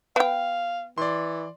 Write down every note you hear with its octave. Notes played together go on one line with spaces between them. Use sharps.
B3 F5 G5
E3 D5 C6